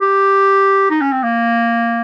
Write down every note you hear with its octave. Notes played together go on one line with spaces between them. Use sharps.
G4
D#4
C#4
C4
A#3